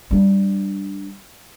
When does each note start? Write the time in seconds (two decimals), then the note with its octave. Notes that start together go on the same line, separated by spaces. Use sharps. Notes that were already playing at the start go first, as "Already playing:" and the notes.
0.11 G3 D4